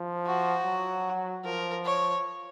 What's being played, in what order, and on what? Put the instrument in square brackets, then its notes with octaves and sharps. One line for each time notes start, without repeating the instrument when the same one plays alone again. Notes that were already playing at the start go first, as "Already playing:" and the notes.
Already playing: [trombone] F3
[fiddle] F#4
[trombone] F#3
[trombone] F3 [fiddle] A#4
[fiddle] C#5